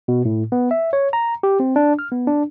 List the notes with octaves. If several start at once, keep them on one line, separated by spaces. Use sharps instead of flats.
B2
A2
B3
E5
C#5
A#5
G4
C4
D4
F6
B3
D4